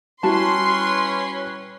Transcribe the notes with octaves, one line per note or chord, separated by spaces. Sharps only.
G3 C#4 E4 F#4 B4 A5 C6